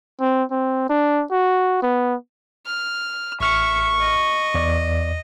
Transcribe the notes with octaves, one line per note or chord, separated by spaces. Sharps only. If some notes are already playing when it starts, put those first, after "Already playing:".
C4
C4
D4
F#4
B3
F6
A1 E5 C#6 F6 C#7
D#5
E2 D5